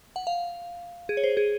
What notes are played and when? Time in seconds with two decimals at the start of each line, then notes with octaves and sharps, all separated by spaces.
0.16 F#5
0.27 F5
1.09 G#4
1.17 C#5
1.24 C5
1.37 G#4